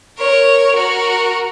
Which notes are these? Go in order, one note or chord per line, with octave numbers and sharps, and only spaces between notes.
A#4 C#5
F#4 A#4